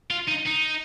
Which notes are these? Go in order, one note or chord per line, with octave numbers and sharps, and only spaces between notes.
F4
D#4
D#4